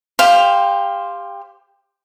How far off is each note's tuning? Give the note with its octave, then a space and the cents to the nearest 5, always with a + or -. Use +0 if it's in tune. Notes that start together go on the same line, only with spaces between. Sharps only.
G4 +25 C5 +0 F5 +0